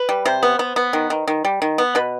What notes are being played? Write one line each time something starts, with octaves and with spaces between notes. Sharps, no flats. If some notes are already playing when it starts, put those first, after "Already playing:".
Already playing: B4
G3
C3 C5
B3
B3
B3
D#3
D#3
D#3
G3
D#3
B3
B2 B4